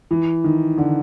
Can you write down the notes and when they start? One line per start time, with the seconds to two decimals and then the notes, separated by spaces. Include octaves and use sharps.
0.11 E3
0.44 D#3
0.78 D3